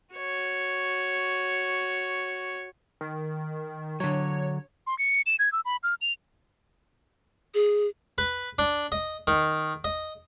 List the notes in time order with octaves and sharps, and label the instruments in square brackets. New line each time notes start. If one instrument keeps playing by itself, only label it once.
[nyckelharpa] F#4 C#5
[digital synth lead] D#3
[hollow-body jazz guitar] D3 F#3 [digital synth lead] C#5
[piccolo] C6
C#7
E7
G#6
E6
B5
F6
F7
[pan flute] G#4
[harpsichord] B4
D4
D#5
D#3
D#5